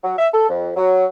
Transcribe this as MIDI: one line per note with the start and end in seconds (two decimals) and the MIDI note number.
0.03 0.14 54
0.17 0.27 76
0.32 0.45 69
0.49 0.70 41
0.76 1.05 54